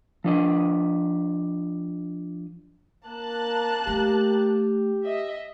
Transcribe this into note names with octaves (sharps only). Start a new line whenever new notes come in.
F3 D4 D#5
A#3 A5 F#6
A3 G4
D#5 E5